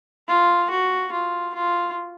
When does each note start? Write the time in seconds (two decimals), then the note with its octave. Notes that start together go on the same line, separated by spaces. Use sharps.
0.28 F4
0.70 F#4
1.12 F4
1.55 F4